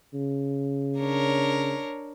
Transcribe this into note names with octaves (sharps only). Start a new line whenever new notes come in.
C#3
D4 A#4 C#5